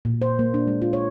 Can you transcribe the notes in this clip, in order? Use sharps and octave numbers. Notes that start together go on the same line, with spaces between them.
A#2
C5
A#3
D4
G#3
F4
C#5